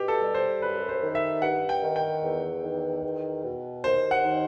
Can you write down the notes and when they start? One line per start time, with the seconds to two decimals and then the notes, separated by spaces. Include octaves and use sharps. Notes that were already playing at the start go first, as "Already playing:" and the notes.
Already playing: B2 G4
0.08 A4
0.22 G3
0.34 C5
0.61 F#2 B4
0.89 C5
1.03 D#3
1.15 E5
1.42 G2 F#5
1.69 G5
1.82 D#3
1.96 G5
2.23 E2
2.63 D#3
3.04 E2
3.44 B2
3.84 D#2 C5
4.11 F#5
4.24 D#3